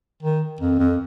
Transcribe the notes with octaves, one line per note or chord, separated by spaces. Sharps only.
D#3
F2
F2